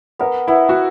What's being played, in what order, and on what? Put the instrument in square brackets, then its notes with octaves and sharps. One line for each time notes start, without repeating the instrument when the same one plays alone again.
[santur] B3 [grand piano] A#4
[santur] B3 [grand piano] E4
[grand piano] F#4